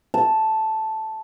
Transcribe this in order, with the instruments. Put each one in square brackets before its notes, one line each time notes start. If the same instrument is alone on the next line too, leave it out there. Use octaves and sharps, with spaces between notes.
[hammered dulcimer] A5